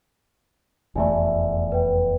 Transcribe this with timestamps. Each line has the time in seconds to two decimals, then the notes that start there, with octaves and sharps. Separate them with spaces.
0.96 F1 E2 A3 D5 E5 G#5
1.72 B4 G5